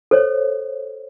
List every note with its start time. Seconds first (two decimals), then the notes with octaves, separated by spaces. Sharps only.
0.11 A4 C5 C#5